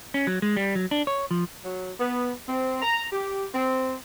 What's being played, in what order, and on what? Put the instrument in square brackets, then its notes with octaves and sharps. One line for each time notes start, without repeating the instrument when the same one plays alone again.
[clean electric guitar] C#4
F#3
G#3
G3
F#3
D4
C#5
F3
[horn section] F#3
B3
C4
A#5
G4
C4